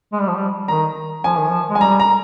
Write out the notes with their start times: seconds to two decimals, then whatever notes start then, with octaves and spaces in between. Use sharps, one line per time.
0.13 G#3
0.20 G3
0.28 F3
0.35 G3
0.68 D#3 A#5
1.24 F3 G#5
1.37 D#3
1.49 F3
1.70 G#3
1.75 G#5
1.80 G3 A#5
2.00 A#5